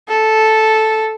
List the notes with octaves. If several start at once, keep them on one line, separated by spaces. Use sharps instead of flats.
A4